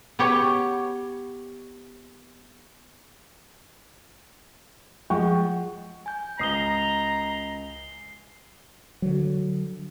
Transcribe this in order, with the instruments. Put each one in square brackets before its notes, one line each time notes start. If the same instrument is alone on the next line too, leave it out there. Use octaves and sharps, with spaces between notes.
[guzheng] B3 G4 C#5
[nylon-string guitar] F3 G#3 F4 [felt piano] F#5 G5 C#6
[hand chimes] G#5 G6
[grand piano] C#2 D#6 [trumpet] A#5 [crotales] C7 G7
[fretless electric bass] D3 F#3